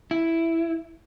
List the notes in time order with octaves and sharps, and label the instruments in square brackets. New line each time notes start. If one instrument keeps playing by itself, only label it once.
[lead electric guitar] E4